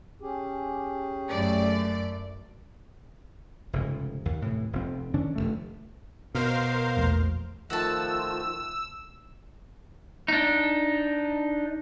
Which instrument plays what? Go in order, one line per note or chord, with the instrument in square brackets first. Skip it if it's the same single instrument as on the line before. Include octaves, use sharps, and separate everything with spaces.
[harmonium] C#4 G4 G#4
[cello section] F#2 A3 D5
[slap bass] F1 G#2 C#3
D#2
A2 C3 E3
F1 F2 C4
D#3 E3 C#4 D4
F1 G#2 A3
[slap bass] B2 [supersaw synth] A#4 C5 F5
[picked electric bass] A#1 E2 A3
[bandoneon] D#3 F3 A3 [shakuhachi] F4 [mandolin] F#4 A5 [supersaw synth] E6
[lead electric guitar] D4 D#4